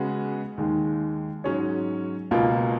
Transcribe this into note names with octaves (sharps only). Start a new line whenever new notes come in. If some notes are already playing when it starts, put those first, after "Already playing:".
Already playing: C#3 G#3 B3 F#4 B4
D#2 D#3 G#3
G#2 F#3 C#4 G#4 C#5
C#2 B2 A#3 F4